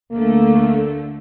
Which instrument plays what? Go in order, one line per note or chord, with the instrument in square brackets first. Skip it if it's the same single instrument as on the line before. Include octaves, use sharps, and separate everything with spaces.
[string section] D2 D3 A3 [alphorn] A#3